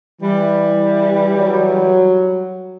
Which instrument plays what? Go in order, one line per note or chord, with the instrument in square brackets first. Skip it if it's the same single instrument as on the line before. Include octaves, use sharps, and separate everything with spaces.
[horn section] E3 G3
[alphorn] F#3